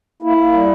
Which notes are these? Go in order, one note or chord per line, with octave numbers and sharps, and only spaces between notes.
A#3 E4
A#3
G3